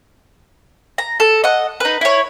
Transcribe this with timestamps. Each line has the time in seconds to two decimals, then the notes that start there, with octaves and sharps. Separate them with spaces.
0.98 A#5
1.20 A4
1.44 D#5 F#5
1.80 D#4 B4
2.01 E4 C#5